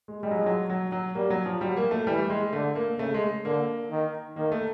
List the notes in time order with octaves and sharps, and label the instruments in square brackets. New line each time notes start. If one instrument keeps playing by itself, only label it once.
[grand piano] G#3
[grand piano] G3 [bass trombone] G#3
[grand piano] F#3
F3
F#3
F#3
F#3
[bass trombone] G3 [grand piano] A#3
[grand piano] F#3
F3
[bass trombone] F#3 [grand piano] G3
[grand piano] A#3
A3
[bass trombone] E3 [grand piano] G3
[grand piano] G#3
[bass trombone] D3 [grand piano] A3
[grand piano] A#3
[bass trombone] C#3 [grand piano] A3
[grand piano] G#3
[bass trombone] D3 [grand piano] A#3
[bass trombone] D#3
[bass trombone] D#3 [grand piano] A#3
[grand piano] A3